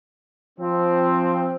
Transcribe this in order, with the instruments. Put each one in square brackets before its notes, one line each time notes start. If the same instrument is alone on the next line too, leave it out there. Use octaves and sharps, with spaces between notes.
[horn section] F3 C4